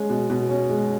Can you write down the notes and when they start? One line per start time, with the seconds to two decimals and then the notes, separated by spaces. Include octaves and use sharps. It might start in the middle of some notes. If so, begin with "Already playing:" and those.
Already playing: G#3 C#4
0.10 B2
0.30 B2
0.49 C#4
0.70 G#3